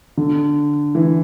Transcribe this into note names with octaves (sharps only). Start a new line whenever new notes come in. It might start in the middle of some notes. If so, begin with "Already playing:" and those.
D3
E3